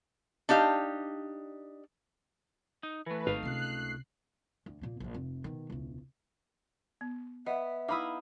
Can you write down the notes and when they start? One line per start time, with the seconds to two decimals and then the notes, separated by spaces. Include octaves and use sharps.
0.49 D4 D#4 G4 F5
2.83 D#4
3.06 E3 A3 B4
3.27 G#1 A3 D#4 F5
3.43 C#2 C3 F#6 C7
4.66 D2
4.81 A#2 A#3
5.00 A#1 D#2
5.14 F1
5.44 B2 D#3
5.70 E1 C#2
7.01 B3
7.46 B3 D#5 E5
7.89 D#4 E4 F5 B5 D6 D#6